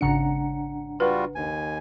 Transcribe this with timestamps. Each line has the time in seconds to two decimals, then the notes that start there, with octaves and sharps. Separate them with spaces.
0.01 G#1 C#3 D4 F#5 A#5 C#7
1.00 G3 F4 F#4 B4
1.35 D#2 G#5